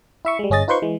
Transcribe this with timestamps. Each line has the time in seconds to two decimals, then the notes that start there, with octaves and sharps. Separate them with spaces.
0.25 E4 E5 C#6
0.39 G3 G#3
0.50 G1 C#4 G#4 D#5 A6
0.68 D#4 F4 B4 C5 C6 C#6
0.82 E3 G#3